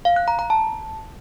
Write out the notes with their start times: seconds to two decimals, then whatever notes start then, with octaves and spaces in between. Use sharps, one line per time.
0.05 F5
0.16 F#6
0.28 A#5
0.39 A#5
0.50 A5